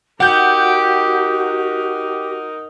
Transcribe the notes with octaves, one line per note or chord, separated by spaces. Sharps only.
D#4 F#4 G4 A#4 F#5 G6